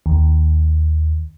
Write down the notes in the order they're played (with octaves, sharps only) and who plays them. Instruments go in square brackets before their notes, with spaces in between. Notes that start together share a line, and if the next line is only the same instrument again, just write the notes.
[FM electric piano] D#2